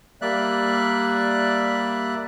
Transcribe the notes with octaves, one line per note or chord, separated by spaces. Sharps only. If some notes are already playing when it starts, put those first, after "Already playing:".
G3 A#3 D5 E5 F#6